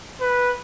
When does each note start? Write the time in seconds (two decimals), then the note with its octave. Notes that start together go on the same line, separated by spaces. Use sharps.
0.21 B4